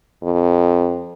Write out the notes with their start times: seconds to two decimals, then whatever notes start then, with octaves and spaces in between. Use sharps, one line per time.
0.23 F2